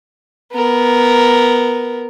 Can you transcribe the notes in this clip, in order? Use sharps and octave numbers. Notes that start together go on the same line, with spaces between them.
B3 A#4